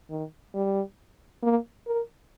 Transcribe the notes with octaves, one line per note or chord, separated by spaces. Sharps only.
D#3
G3
A#3
A#4